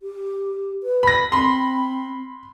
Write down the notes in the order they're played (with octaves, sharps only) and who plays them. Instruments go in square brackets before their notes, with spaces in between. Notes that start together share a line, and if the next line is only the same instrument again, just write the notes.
[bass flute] G4
B4
[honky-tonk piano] B5 A#6
[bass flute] C4 [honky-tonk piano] B5 C6